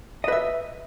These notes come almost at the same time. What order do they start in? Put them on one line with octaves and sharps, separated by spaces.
D#5 B4 E5